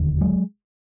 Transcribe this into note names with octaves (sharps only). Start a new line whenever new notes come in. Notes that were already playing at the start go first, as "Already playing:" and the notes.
Already playing: E1 D#2 D3
F#3 G#3